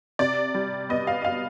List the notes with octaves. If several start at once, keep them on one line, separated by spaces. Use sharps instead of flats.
C3 D5
G3
B3 D#5
F5
D#5
F5